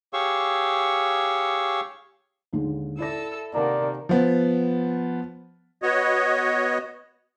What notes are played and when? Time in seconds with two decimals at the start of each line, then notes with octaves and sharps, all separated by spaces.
0.13 G4 G#4 C#5 F5 C#6 E6
2.53 D#2 D3 G#3
2.99 E4 A4 D5 E6 A#6
3.55 C3 D#3 A#3 D5 F#5 A5 A#5
4.09 F3 B3
5.82 B3 F#4 C#5 D#5